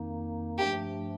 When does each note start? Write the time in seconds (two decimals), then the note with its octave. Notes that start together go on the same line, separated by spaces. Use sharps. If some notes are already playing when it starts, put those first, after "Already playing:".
Already playing: F2 D#3 A#3 D#4
0.58 G2 F3 A3 D4 G4